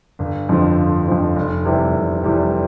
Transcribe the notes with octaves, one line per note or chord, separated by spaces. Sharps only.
G1
F2 D3 F3
G1
F2 D3 F3
F1
E2 C3 E3 G3
F1
E2 C3 E3 G3